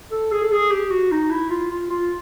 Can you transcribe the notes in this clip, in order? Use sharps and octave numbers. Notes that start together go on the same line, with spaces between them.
A4
G#4
A4
G#4
G4
F#4
D#4
E4
F4
F4
F4